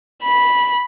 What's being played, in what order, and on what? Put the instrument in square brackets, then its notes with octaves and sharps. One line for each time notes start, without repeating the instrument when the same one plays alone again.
[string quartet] B5